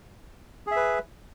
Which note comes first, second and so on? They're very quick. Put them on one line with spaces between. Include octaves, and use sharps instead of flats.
G#4 E5 B4